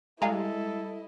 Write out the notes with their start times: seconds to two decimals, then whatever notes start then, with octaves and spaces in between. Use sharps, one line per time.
0.22 G3 G#3 E4 A4 D#5 F5 G#5 A#5